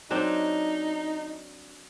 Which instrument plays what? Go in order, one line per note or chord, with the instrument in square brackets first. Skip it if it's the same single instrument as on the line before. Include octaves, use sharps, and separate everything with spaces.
[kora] F#3 C4 D4 [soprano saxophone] D#4